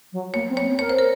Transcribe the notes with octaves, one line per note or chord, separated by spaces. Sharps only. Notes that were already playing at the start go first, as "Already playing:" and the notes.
F#3
A#3 C#5
C4
C#5
C4
A#4 C#5
C5
A#4